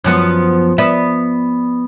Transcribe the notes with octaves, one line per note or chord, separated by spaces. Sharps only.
F#2 F3 B3
B3 D5 E5